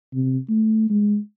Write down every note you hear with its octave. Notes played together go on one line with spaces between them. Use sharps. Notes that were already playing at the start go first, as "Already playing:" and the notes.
C3
A3
G#3